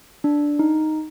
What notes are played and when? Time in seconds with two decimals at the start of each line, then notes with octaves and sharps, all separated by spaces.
0.24 D4
0.59 D#4